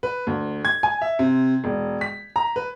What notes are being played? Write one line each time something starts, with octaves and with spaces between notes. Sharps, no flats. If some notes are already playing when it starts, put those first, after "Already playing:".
B4
D2
G#6
G#5
E5
C3
E1
B6
A#5
B4